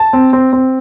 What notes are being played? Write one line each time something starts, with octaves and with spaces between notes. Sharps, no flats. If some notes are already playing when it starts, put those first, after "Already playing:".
Already playing: A5
C4
C4
C4